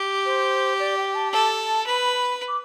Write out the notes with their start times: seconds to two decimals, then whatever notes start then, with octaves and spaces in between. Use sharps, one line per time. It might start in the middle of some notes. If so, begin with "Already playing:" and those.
Already playing: G4
0.25 C5
0.79 D5
0.97 G5
1.14 A5
1.32 A4 A5
1.86 B4 B5
2.48 D6